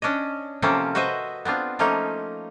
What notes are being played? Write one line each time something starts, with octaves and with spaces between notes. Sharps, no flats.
C#4 D4 C#5 D#5
C3 F3 A#3 C4 C#4 A4
F#4 B4 C5 D#5 E5
B3 C4 D4 F4
F3 A3 A#3 C#4 D#4